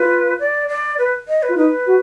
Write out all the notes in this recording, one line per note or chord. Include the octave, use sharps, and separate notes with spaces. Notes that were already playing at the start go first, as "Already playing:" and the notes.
Already playing: F4 B4
D5
D5
B4
D#5
B4
F4
D#4 B4
F#4